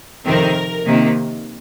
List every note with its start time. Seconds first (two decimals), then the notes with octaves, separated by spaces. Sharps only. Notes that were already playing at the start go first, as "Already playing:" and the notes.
0.25 F2 C3 D#3 C4 A#4
0.85 C3 D#3 A#3